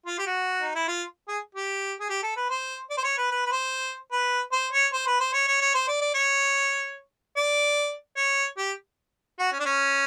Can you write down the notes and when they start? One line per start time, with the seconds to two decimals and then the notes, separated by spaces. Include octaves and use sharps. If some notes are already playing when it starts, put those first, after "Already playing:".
0.06 F4
0.19 G4
0.26 F#4
0.61 D#4
0.75 E4
0.88 F4
1.28 G#4
1.55 G4
2.00 G#4
2.09 G4
2.23 A4
2.36 B4
2.50 C5
2.90 D5
2.97 C5
3.04 C#5
3.17 B4
3.31 B4
3.46 B4
3.52 C5
4.12 B4
4.52 C5
4.72 C#5
4.93 C5
5.07 B4
5.20 C5
5.33 C#5
5.47 C#5
5.61 C#5
5.74 C5
5.88 D5
6.01 D5
6.14 C#5
7.36 D5
8.17 C#5
8.58 G4
9.39 F#4
9.52 C#4
9.60 D4
9.65 C#4